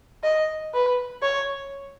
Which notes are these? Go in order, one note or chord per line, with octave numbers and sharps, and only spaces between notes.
D#5
B4
C#5